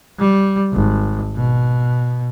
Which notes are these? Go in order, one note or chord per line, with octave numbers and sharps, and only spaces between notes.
G3
G#1
B2